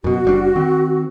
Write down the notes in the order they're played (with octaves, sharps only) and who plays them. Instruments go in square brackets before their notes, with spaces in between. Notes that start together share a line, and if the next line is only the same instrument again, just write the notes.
[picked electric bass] F#2 B2 [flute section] F#4
[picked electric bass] F#1 G3 D4
D#3 C4